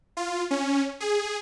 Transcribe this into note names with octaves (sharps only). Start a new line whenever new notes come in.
F4
C#4
G#4